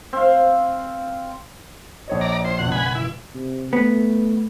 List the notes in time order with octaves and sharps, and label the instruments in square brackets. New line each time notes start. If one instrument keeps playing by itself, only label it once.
[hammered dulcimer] C4 F5
[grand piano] A#1 C#5 D#5
[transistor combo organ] D5 A#5
[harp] F4 [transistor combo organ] C5
[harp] F#1 E2 B2 [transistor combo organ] F#5
[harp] G#3 B3 [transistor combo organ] F#5 G#5 B5
[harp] E3 [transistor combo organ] E4
[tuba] C3
[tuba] A3 [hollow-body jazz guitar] B3